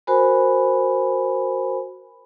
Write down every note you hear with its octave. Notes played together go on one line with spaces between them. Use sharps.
F#4 A#4 C5 G#5 B5